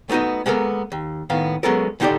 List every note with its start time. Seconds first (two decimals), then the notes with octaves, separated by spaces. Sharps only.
0.09 A3 B3 D#4 F#4 D#5
0.46 G#3 A#3 B3 A4 A#4
0.92 D#2
1.30 A2 D#3 B3 F5
1.63 F#3 G#3 B3 C#4 A4 A#4
2.00 A2 D3 D#4 G4 A4 D5